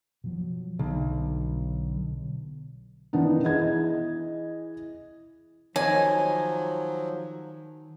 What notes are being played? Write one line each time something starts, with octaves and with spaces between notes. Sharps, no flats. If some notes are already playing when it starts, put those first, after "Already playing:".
B2 F3 F#3
B1 D3
D#3 E3 B3 D4 D#4
E3 G#4 D#5 G#6
D#3 F3 F#3 C#5 G#5